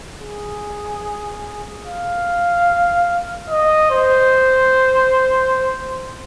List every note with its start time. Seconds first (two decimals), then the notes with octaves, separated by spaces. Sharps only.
0.20 G#4
1.85 F5
3.50 D#5
3.91 C5